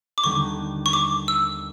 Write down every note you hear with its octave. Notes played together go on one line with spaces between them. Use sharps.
D6
D#2 D3 G3 B3 D#4 C#6
C#6
D6
E6